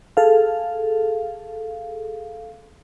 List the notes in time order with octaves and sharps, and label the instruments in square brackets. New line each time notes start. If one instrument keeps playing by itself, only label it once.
[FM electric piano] G#4 A4 F5